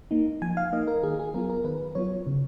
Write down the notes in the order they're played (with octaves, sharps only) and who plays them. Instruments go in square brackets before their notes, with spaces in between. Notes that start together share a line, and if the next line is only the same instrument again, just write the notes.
[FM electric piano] A#3 D#4
F3 G#5
F5
A#3 D#4 D#5
A#4
D#3 G#4
G#4
F#3 B3 F4 A#4
A#4
D#3 B4
F#3 B3 F4 C#5
C#3